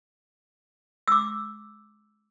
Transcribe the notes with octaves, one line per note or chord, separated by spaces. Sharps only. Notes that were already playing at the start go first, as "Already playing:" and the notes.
D6 E6